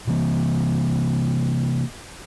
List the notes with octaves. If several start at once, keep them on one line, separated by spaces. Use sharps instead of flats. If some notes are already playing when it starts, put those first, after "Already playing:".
C3 E3 A#3